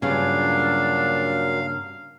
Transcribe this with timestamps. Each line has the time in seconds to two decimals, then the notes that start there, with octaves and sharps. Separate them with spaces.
0.02 G2 A#2 C#3 F#3 D4 F5